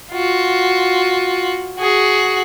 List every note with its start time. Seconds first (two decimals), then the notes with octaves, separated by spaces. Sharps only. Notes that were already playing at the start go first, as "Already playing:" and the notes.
0.13 F4 F#4
1.79 F#4 G#4